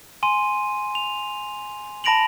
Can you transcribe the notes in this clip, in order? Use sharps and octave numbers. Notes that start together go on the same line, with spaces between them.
G#5 C6 D#7
F7
A5 B5 A#6 D7 F7 F#7